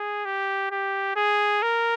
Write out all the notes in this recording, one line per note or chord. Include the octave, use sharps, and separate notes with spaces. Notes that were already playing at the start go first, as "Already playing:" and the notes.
Already playing: G#4
G4
G4
G#4
A#4